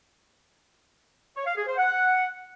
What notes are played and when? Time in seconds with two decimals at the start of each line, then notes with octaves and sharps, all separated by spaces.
1.37 C#5
1.47 F5
1.57 G#4
1.67 C5
1.78 F#5